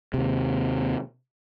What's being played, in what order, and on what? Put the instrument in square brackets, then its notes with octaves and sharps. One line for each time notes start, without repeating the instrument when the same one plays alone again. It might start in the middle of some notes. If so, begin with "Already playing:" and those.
[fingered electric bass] D#2 C3